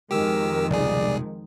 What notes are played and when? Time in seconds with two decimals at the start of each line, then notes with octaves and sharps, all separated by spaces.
0.11 F2 D#3 G#3 G4 A#4 E6
0.70 F1 C#2 B2 G3 G#4 D5